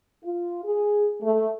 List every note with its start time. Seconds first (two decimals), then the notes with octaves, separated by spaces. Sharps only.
0.24 F4
0.64 G#4
1.22 A3